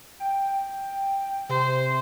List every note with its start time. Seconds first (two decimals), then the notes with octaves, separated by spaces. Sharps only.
0.20 G5
1.49 C3 C5